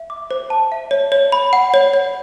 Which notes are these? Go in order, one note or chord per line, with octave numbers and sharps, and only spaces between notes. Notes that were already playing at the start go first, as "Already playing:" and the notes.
Already playing: E5
D6
C5
A5
E5
C#5
C#5
B5
F#5
C#5
C#5